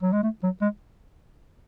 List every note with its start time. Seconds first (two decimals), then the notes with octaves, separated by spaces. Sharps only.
0.03 F#3
0.12 G#3
0.23 A3
0.43 F#3
0.62 G#3